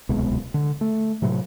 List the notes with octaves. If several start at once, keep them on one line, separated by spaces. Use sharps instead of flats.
D1 C2 B2 G#3
D3
A3
A2 C3 F#3